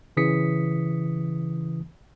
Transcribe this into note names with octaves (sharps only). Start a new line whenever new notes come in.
C#3 E3 D#6 B6 C#7